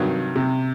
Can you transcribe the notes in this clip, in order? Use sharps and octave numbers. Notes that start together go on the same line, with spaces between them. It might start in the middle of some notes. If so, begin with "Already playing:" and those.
Already playing: G2 C3 D#3 F#3
C3